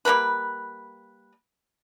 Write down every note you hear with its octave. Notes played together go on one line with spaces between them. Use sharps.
G3 A#3 A#4 B4